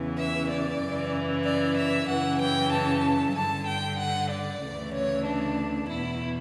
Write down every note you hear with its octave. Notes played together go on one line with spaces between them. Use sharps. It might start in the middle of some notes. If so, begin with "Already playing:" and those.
Already playing: E2 C#3 E3
E5
D5
F#2 C#3 E3
D5
E5
F#2 C#3 E3 F#5
G5
A5
G2 D3 A5
G5
F#5
D5
D2 C#3 E3
C#5
D4
E2 B2 E4